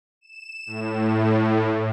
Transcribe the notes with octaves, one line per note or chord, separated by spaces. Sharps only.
E7
A2